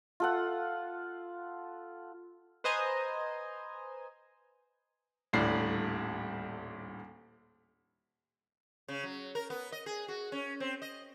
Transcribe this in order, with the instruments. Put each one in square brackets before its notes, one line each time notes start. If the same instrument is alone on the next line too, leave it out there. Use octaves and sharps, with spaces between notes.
[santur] F4 A4 F#5
[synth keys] B4 C5 D#5 G#5 A#5
[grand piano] D#1 D2 A2 G3 C7
[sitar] C#3
F#3
A#4
B3
D#5
G#4
F#4
C#4
C4
D#5